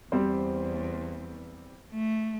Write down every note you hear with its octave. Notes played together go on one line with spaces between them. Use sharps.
E2 G3 C4 C5
A3